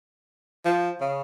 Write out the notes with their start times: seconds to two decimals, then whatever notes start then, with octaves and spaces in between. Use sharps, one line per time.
0.65 F3
1.01 C#3